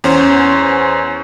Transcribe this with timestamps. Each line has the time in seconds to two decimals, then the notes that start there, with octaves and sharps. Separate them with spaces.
0.04 E2 C#4 C5